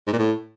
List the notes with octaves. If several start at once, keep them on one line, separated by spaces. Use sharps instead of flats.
G#2
A#2
A2